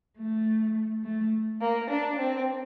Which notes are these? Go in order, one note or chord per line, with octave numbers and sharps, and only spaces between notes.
A3
A3
A#3
D4
C4